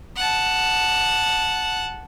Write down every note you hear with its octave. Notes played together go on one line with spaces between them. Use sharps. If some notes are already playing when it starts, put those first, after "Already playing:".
F#5 A5